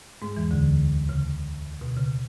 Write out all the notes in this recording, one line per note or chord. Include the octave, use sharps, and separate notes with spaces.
G#2 G#3
E2 E3
D2 D3
C#3
B2
C#3